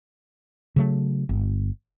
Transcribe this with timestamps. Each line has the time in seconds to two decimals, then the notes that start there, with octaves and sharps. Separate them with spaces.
0.76 C#3 F#3 A3
1.29 G1